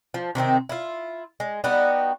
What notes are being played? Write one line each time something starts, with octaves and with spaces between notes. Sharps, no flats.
F3
C3 D#3 C4 D#4
E4 F4
G#3
G3 B3 D#4 F#4